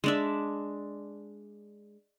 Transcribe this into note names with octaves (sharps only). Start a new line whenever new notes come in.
G#3 D4 E5